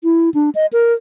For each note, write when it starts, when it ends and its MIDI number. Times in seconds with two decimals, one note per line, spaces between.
0.04 0.30 64
0.34 0.50 62
0.55 0.66 75
0.73 0.93 70